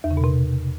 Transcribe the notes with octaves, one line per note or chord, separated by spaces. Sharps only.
E2
C#3
B2
C3